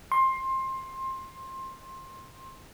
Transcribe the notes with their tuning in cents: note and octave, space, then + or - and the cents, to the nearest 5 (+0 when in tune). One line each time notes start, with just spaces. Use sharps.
C6 +20